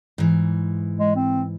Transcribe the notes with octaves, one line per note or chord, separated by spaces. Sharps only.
G#2 E3
G#3
C4